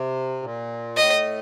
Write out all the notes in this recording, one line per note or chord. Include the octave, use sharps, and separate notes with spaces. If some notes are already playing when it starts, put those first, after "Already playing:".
Already playing: C3
A#2
A2 D#5